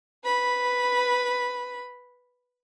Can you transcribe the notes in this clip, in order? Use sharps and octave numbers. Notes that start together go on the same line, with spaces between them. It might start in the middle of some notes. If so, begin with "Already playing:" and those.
B4 B5